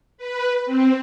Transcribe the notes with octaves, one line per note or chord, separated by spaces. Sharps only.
B4
C4